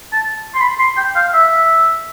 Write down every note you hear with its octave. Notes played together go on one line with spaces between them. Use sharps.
A5
C6
B5
C6
G5
F5
E5